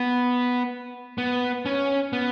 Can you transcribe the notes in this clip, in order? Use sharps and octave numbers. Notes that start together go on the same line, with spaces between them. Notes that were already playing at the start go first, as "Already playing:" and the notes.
Already playing: B3
B3
C#4
B3